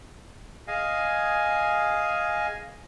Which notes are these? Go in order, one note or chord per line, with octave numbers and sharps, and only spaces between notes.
G#4 D#5 F5 G#5